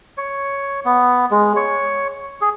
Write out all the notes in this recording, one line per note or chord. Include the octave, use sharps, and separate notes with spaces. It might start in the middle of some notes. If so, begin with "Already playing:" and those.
C#5
B3
G#3
C#5
G#4